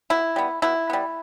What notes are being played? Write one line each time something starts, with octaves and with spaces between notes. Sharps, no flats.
B2 E4
G3 B3
B2 E4
G3 B3